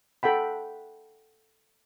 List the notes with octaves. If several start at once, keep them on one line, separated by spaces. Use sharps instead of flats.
A4 F#5 G5 B5